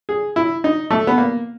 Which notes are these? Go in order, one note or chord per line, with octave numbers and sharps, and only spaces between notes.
G#4
E4
D#4
A3
B3
A#3